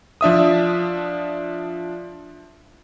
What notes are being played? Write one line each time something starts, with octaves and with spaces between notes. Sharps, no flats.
F3 D4 E5 D#6